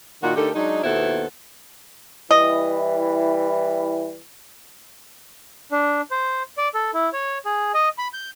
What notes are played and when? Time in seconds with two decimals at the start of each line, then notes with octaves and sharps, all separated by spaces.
0.22 A#2 D#3 F#4
0.36 D3 A3 D#4 G4 A4 A#4
0.55 F#3 G#3 D4 D#4
0.84 D#2 B2 B3 E4 A4 C5
2.31 E3 G3 E4 D#5
5.71 D4
6.11 C5
6.58 D5
6.74 A4
6.94 E4
7.13 C#5
7.45 G#4
7.74 D#5
7.98 B5
8.13 G6